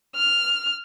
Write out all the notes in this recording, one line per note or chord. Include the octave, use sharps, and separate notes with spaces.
F6